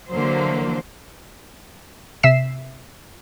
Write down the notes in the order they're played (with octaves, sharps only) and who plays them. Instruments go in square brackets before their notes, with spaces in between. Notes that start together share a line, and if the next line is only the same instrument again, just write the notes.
[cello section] D3 E3 F#3 A#3 C5
[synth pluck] C3 E5 B6 C7 E7